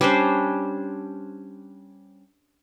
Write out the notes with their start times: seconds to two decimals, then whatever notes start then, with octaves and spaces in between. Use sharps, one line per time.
0.01 G3 C#4 D4 C5